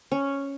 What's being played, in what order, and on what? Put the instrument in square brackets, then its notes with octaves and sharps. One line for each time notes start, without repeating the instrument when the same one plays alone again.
[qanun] C#4